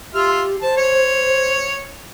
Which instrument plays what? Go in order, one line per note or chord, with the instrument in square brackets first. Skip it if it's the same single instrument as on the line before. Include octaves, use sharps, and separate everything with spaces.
[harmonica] F4 E5 F6 [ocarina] G4
[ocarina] C5 [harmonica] A5
[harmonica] C#5